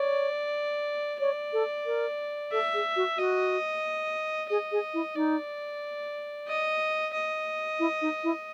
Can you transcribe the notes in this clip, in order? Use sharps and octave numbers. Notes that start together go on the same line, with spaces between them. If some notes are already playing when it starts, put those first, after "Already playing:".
Already playing: C#5 D5
C#5 D5
A4
A#4
A4 E5
G#4
F#4
F#4 D#5
G#4 D#5
G#4
E4
D#4 D5
D#5
D#5
E4
D#4
E4